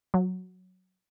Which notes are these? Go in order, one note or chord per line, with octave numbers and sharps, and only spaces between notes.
F#3